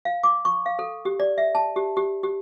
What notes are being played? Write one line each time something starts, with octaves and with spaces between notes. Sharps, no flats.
F5
D6
C#6
F5
A4
G4
D5
E5
A5
G4
G4
G4